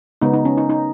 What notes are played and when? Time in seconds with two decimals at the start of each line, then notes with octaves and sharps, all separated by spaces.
0.22 C#3 G#3 B3 D#4
0.34 D#4
0.45 C#4
0.58 D#4
0.70 D#4